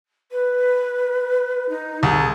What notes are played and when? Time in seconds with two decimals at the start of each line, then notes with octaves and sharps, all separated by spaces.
0.31 B4
1.69 D#4
2.03 C2 G#4